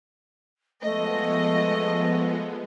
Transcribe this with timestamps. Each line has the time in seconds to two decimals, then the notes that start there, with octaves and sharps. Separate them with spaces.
0.82 F3 G#3 A3 B3 D#5